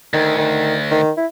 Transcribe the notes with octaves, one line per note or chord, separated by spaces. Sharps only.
D2 D#3
D#3
D#3
E4